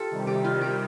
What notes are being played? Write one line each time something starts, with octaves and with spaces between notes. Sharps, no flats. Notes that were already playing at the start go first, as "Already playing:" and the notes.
Already playing: F4 G4 A4
C3 D#3 G3
G4
F4
G4